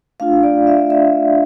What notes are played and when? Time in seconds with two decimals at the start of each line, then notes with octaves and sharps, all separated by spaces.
0.20 A3 D4 F4 F5
0.43 D5
0.67 E5
0.90 E5